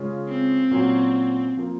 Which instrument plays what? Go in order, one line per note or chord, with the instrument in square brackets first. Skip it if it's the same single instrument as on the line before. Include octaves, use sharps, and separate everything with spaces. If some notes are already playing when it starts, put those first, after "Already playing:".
Already playing: [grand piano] C#3 G#3 C#4 F4
[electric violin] C4
[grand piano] A#2 F#3 C#4 F#4
F3 A#3